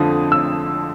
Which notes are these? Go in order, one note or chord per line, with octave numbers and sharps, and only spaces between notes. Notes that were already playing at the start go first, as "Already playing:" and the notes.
Already playing: F2 D3 F3 D#6
E6